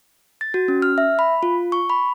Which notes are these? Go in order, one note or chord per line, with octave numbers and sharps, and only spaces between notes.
A6
F#4
C#4
F6
E5
B5
F4
C#6
B5